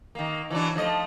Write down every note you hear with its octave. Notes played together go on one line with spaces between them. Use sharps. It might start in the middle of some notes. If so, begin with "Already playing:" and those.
D#3 A#3
E3 F#3 D4
F3 A3 D#5